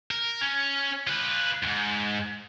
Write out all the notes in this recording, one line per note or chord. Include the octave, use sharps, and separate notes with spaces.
A#4
C#4
F4 B4
E2 G#2